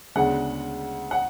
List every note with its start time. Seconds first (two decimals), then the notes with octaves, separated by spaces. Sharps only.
0.15 D2 C#3 G#3 B3 D4 F#5
1.11 F#5